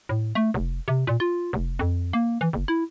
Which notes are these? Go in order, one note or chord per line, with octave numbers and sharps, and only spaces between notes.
A2
A3
F1
C3
A#2
F4
F1
F2
A#3
E3
F#1
E4